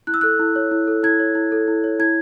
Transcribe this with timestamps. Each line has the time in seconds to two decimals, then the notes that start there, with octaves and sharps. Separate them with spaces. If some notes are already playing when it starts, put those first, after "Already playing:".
0.07 E4 F#6
0.14 E6
0.21 A4 F#6
0.40 E4
0.56 C#5
0.71 E4
0.87 A4
1.03 E4 G#6
1.20 C#5
1.35 E4
1.52 A4
1.68 E4
1.84 C#5
2.00 E4 G#6